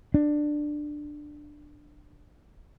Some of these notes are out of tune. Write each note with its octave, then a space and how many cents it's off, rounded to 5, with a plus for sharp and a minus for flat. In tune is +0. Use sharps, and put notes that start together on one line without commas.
D4 +15